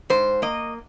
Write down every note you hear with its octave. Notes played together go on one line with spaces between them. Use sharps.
G#2 C5
A#3 D#5